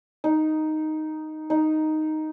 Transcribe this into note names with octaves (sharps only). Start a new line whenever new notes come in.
D#4
D#4